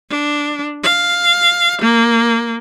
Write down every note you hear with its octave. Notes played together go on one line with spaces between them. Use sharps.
D4
F5
A#3